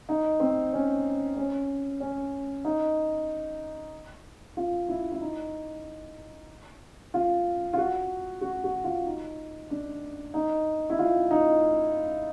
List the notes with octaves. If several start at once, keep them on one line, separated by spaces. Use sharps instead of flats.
D#4
C4
C#4
C#4
C#4
D#4
F4
E4
E4
D#4
F4
F4
F#4
F#4
F#4
F4
D#4
D4
D#4
E4
F4
D#4